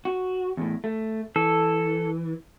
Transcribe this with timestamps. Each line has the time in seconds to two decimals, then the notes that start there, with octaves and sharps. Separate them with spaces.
0.05 F#4
0.57 E2 A2
0.84 A3
1.36 E3 A4